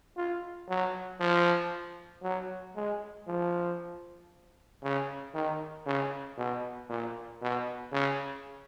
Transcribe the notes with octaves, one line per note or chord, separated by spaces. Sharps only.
F4
F#3
F3
F#3
G#3
F3
C#3
D#3
C#3
B2
A#2
B2
C#3